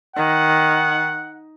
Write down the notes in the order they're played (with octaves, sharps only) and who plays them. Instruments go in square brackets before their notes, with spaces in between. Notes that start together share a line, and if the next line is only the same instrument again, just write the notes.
[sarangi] D#3 [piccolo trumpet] F#5